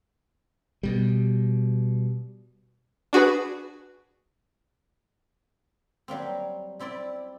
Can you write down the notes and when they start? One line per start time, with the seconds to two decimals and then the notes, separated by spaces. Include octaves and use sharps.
0.83 B2 G3
3.13 D4 F#4 G#4 B4
6.08 F#3 G3 A#3 C4
6.79 G3 C4 E4 D5